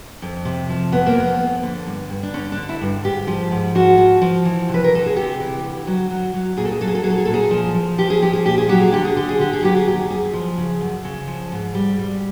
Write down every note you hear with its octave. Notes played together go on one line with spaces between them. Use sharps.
F2
C3
F3
F2 B3
A#3
F2 B3
F2
D3
G2
G2
D4
D3 C#4
D4
D3
E4
G2
G#2 G4
F3
G#2
F3 F#4
F3
F3
E3
C3
B4
A#4
D2 A4
G#4
C3 G4
E3
D2
F#3
F#3
F#3
A#2 G#4
A4
G#4
F#3 A4
G#4
A4
F#3 G#4
A4
G#4
A#2 A4
G#4
F3
F3
F3 G4
G#4
F3 G4
G#4
A#2 G4
G#4
F#3 G4
G#4
D3 G4
G#4
D3 G4
G#4
D3 G4
G#4
F#3 G4
G#4
D#2 G4
F#2 G#4
F3
C#3
F#2
C#3
F3
G#2
G3
G3